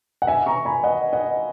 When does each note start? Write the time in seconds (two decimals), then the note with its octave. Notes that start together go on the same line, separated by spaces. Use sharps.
0.22 F#5
0.27 E5 G#5
0.46 A#5 C#6
0.65 G#5 B5
0.84 D#5 F#5
1.13 D#5 F#5